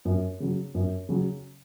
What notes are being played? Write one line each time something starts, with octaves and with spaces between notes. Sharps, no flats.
F#2
C#3 F#3
F#2
C#3 F#3